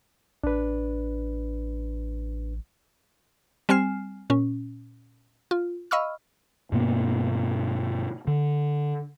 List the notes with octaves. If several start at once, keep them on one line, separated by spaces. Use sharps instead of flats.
A1 D4 B4
G3 C4 G#5 F6 C7 E7
A#2 C#4
F4
D#5 F5 B5 C#6 E6 F6
G2 B2 A#3 B3
D3